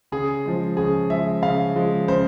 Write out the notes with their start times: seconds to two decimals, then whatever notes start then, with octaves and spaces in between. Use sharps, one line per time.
0.12 C#3 G#4
0.45 F3 G#3
0.77 C#3 G#4
1.10 F3 G#3 E5
1.42 C#3 F5
1.76 F3 G#3
2.08 C#3 C5